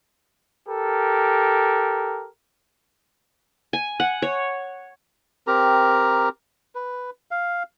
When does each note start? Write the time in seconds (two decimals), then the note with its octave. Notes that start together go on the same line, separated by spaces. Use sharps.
0.68 G4 A4 A#4
3.73 G#5
4.00 F#5
4.22 C#5
5.47 C4 G4 A#4 A#5
6.75 B4
7.31 F5